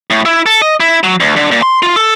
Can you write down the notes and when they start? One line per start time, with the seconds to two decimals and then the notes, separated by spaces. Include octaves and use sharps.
0.10 A2
0.25 E4
0.46 A4
0.62 D#5
0.80 E4
1.04 F#3
1.20 D2
1.36 D3
1.51 A#2
1.62 C6
1.82 F4
1.96 A4